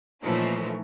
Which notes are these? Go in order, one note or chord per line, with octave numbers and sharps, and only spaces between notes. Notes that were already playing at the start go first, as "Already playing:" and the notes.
A#2 E3 F3 A3 C#4 D#4